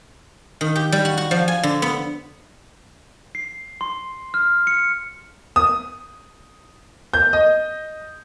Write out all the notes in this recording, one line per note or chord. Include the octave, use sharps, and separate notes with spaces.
D#3
G4
G3
F#4
F#4
F3
G#5
D3
B3
C7
C6
F6
C#7
D#6
G6
D#5